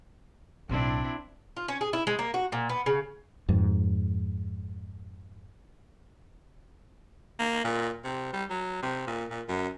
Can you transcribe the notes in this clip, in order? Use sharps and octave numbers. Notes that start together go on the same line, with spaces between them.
B1 A2 C4 D4 E4
F4
C#4
G#4
E4
G#3
A#3
F#4
A#2
B3
C#3
F2 G#2
A#3
A#2
C3
G3
F#3
C3
A#2
A#2
F#2